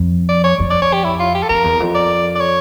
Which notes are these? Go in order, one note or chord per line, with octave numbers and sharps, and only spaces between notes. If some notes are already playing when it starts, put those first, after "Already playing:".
Already playing: F2
D5
C#5
F2
D5
C#5
G4
E4
F4
G4
A4
F2 A#4
E2
F2
D5
D5
C#5